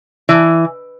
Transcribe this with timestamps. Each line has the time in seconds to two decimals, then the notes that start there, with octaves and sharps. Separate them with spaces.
0.29 E3